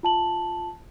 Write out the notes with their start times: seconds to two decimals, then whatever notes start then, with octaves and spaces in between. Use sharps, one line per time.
0.03 F4 A5 F#7